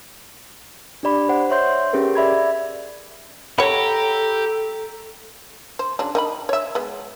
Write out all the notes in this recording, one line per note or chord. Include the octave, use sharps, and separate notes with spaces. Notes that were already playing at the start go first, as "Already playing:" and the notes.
D4 G4 D5 B5
C5 F#5
C#5 E5 C6 G6
C#4 G4 G#4 A#4 B4
D5 E5 B5 G#6
G4 A4 C#5 F#5 A#5 B5
C5
C#3 F#3 D4
D#3 D#5 B5
C#5 E5
G#3 B3